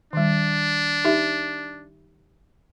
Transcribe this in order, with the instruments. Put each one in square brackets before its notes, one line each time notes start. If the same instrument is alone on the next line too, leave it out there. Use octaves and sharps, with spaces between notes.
[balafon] D#3 G3 [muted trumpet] D4
[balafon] D#4 G4 E5